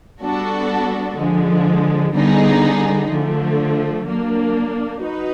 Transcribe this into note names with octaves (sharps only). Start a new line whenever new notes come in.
G3 B3 D4 F#4 A4
D3 F3 G#3
D3 G3 B3 D#4 G#4
D3 F3 A3
F#3 A#3 D4
D#4 F#4 B4